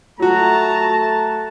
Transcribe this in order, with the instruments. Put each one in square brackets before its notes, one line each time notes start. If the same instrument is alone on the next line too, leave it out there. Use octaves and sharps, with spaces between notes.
[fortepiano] F#3 F#4 [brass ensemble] A3 A5 [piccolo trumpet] A#5